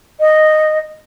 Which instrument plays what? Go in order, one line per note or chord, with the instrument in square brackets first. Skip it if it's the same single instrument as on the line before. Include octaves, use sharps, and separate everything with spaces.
[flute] D#5